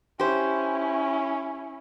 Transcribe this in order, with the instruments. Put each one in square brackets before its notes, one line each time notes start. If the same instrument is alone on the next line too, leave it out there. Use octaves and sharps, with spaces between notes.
[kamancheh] C#4 E4 [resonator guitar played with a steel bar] G4 C5